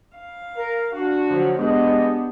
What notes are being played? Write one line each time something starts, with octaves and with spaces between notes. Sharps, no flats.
F5
A#4
D4 F#4
D3 F3 F#3
G#3 B3 D4 G4 D#5